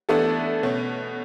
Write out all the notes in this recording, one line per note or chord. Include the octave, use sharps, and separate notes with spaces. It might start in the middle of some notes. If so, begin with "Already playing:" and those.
E3 A3 B3 D4 A4
B2 A3 C#4